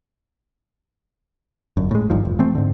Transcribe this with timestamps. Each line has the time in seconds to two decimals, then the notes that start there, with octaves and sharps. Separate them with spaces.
1.77 G1 F#2
1.91 A2 G#3
2.10 G#1 G2 D#3 F3
2.25 E1
2.39 E3 A3 C4
2.55 G#2 D3